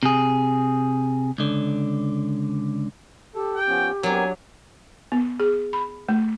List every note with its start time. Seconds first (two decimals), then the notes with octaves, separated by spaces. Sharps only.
0.03 C3 G#4
1.38 C#2 D3
3.35 G4 A4
3.56 G5
3.68 F3 B3 C#4
4.03 F#3 B3 C4 D4 A#4 G#5
5.12 B3
5.40 G#4
5.73 B5
6.09 A3